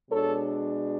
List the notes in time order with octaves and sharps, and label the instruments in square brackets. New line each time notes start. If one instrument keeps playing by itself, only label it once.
[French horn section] B2 G#3 D4 A4 C#5